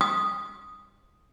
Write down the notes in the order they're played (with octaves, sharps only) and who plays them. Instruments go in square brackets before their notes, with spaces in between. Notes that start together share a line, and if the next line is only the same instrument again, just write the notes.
[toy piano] D#6